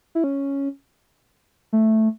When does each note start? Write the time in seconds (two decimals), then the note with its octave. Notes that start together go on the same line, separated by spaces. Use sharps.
0.15 E4
0.24 C#4
1.73 A3